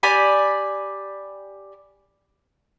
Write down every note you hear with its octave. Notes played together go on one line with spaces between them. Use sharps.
G4 D5 G#5 B5